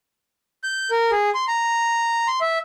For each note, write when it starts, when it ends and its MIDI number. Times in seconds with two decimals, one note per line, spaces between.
0.64 0.90 91
0.91 1.11 70
1.12 1.30 68
1.35 1.45 84
1.48 2.28 82
2.28 2.39 84
2.41 2.58 76